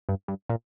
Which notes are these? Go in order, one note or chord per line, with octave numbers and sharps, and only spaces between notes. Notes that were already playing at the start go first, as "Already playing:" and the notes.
G2
G2
A#2